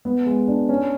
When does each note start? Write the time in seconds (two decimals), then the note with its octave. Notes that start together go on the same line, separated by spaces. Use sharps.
0.05 B3
0.26 G#3
0.48 D4
0.69 C#4